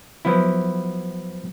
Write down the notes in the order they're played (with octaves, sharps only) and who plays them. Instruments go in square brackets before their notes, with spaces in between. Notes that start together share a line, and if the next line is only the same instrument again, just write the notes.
[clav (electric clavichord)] F3 F#3 B3 E4